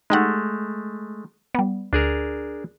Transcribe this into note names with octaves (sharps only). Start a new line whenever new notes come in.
G#3 A3 D#4 G4 F#5
G3 B3
D2 D4 G#4 A#4